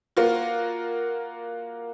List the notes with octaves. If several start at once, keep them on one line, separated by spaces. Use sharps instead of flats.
A#3 F4 F#4